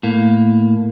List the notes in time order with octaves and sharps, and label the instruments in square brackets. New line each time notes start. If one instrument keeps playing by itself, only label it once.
[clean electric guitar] A2 A#3